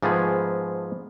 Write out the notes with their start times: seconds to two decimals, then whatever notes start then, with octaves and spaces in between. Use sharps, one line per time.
0.03 G#2 F3 A3 B3 G#4